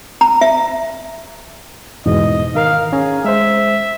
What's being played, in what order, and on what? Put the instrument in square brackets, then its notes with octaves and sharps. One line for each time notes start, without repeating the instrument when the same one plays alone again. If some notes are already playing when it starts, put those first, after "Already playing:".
[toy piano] A#5
E5
[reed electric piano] E2 G#2 B2 [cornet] D#5
[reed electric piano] D#3 A#4 [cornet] F5
[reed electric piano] C#4 G#5 A#5 [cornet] G#4
[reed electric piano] G#3 C5 [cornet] E5